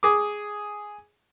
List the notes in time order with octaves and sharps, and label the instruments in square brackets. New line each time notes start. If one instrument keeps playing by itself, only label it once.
[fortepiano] G#4 D6